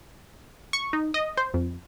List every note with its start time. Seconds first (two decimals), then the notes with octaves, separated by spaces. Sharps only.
0.73 C#6
0.93 D#4
1.14 D#5
1.37 C5
1.54 F2